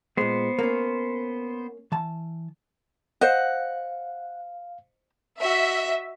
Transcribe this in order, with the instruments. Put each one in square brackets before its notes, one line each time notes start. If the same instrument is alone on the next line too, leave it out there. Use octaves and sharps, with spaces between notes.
[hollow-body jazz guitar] A#2 G#3 [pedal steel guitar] B3 C5
[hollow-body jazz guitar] A#3 C#4
E3 A5
[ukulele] C5 D#5 [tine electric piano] F5 [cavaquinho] F#5
[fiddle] F#4 D#5 [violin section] E5